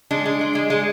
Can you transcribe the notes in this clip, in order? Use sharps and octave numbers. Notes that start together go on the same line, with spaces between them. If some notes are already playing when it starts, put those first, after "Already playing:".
G#3 D4
G#3
G#3
G#3
G#3